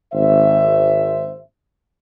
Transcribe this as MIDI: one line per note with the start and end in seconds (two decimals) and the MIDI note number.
0.13 1.39 32
0.13 1.39 72
0.13 1.39 76